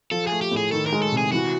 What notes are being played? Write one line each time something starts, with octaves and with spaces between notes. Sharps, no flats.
F3 A4
A3 G#4
G4
A2
G#4
D#3 A4
A#4
G#3
A4
C3
G#4
E3 F#4